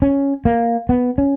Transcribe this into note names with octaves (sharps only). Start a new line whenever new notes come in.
C#4
A#3
B3
C#4